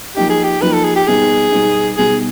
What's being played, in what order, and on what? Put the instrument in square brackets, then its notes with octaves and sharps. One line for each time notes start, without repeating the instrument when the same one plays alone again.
[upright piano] F3 A#3 D#4 [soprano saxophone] G4
[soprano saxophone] G#4
G4
[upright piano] F3 A#3 D#4 [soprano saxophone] B4
[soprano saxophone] A4
G#4
G4
[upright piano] B2 G3 B3 D#4 [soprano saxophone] G#4
[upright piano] B2 G3 B3 D#4
[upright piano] B2 G3 B3 D#4 [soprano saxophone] G#4